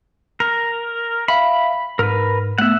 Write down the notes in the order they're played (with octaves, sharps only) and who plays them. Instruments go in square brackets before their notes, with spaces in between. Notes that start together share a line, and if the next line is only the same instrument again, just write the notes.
[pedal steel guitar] A#4
[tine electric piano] E5 F5 [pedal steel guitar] B5
[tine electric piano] G#2 [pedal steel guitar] A#4 B4
[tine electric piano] A3 B3 [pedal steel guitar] E5 F#5